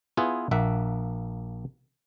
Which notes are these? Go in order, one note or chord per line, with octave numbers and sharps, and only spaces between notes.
B3 E4 F4 G#4 B4
A#1 A#3 E5 F#5